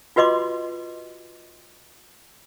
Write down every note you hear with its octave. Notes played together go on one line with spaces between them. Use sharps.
F4 F#4 B4 D#5 C6 D6